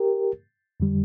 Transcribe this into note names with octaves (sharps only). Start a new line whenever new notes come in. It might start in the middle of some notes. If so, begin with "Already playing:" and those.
Already playing: G4 A#4
F2 D3 G3